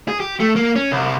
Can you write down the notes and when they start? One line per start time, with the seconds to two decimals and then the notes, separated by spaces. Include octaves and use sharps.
0.08 G#4
0.20 G4
0.40 A3
0.56 A#3
0.76 C#4
0.92 C2